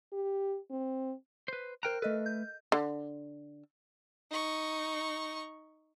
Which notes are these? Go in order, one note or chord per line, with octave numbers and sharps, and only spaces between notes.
G4
C4
B4 C5
A#4 C5 G5 A#5 F6 F#6
A3 A4 B4 D#5
G6
D3
D#4 C#6